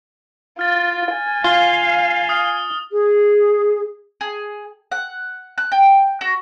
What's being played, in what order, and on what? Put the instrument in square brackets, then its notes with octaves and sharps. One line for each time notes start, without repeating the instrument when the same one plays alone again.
[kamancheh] F4 [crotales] F6 A6
[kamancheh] G#5
[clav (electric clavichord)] F4 [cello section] F5 [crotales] G7
[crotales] D#6 F6
[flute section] G#4
[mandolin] G#4
F#5
F#6
G5
F#4